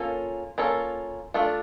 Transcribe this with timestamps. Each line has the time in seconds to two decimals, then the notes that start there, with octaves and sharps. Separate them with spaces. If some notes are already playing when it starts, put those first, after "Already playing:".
Already playing: A#3 C#4 F4 A4
0.58 A#3 C#4 F4 A4
1.34 A3 D4 F4